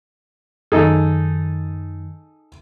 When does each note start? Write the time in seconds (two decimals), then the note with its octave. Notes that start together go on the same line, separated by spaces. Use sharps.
0.72 F#2 D#3 D#4 G#4 A4